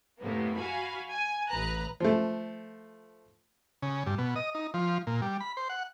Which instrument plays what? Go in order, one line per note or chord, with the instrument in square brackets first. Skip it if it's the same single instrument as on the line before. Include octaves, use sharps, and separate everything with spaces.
[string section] F#2 A2 C3 A#3 B3
F#4 F5 G#5 B5
G#5
A1 B4 A#5 F#6
[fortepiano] F3 A3
[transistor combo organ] C#3
G2
B2
D#5
D#4
F3
A#2
G3
B5
C5
F#5